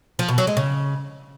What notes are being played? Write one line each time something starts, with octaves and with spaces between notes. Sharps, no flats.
F3
B2
F#3
G#3
C#3